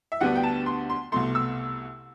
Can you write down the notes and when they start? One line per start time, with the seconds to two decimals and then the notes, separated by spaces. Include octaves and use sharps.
0.12 E5
0.21 D2 D3 G3 B3 D4 F#5
0.36 G5
0.43 A5
0.66 C6
0.90 C6
1.12 C2 B2 A3 C6
1.35 E6